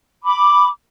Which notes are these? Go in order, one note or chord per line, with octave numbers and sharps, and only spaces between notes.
B5 D6